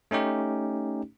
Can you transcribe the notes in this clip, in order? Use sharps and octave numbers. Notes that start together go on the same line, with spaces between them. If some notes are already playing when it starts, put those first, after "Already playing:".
A3 C#4 D#4 G4